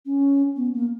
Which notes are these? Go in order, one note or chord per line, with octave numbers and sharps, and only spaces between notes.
C#4
B3
A#3